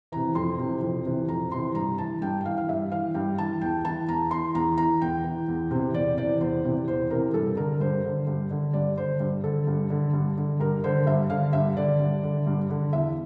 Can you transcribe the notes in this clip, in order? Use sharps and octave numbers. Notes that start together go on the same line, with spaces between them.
C3 E3 A#5
F2 C6
C3 E3
F2
C3 E3
F2 A#5
C3 E3 C6
G2 A#5
E3 A5
G2 G5
G5
E3 F5
F5
G2 E5
E3 F5
G2 G5
E3 A5
E2 G5
E3 A5
E2 A#5
E3 C6
E2 A#5
E3 A#5
E2 G5
E3
E2
C3 E3
E2 D5
C3 E3 D5
E2 C5
C3 E3
E2 C5
C3 E3 A#4
G2 A4
D3 A#4
G2 C5
D3
G2
D3
G2 D5
D3 C5
G2
D3 A4
G2
D3
G2
D3
G2 A#4
D3 C5
G2 E5
D3 F5
G2 E5
D3 D5
G2
D3
G2
D3
E2 E5